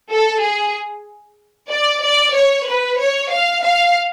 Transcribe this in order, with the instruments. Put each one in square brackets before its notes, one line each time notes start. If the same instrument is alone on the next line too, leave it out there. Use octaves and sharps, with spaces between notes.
[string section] A4
G#4
D5
D5
C#5
B4
C#5
F5
F5